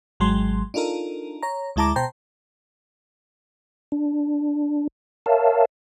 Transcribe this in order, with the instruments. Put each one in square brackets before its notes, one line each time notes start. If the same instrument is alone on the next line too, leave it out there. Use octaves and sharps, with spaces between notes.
[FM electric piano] G#1 F#3 G#3 C6
D4 D#4 F4 A4 A#4
C#5 A#5
D2 G#3 E4 A5 A#5 D6
B2 C5 G5 A5 A#5 G6
[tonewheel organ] D4
A#4 C#5 E5 F5 A5